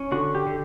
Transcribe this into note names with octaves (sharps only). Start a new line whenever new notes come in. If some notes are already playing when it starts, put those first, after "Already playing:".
Already playing: C#4
D3 F#4
G4
D3